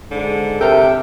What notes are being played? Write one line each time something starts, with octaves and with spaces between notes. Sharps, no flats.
G#2 D3
C3 A4 A#4 C5 E5 G5